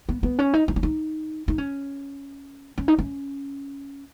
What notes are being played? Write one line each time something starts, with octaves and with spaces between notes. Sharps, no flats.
B3
B3
C#4
D#4
D#4
C#4
D#4
D#4
C#4
C#4
D#4
C#4